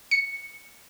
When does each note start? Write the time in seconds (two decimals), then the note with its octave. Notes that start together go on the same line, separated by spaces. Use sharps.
0.11 C#7